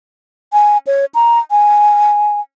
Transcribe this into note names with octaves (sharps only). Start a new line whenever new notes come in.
G#5
C#5
A#5
G#5